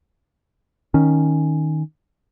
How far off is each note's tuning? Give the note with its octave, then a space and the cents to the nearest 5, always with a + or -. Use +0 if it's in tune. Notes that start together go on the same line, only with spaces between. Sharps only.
D#3 +0 C#4 +0